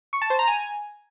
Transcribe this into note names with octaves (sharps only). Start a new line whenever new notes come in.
C#6
A5
C5
A#5
G#5